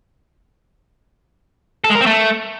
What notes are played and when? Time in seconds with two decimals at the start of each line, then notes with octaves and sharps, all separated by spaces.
1.84 A4
1.90 G#3
1.95 A#4
2.01 C4
2.06 A3